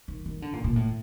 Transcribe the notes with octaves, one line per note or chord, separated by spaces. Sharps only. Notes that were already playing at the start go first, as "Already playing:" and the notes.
D#3
D#3
D3
A#2
A#2
A2